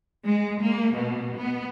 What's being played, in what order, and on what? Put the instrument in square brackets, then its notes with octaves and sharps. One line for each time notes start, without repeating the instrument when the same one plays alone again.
[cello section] G#3
A#3
B2
B3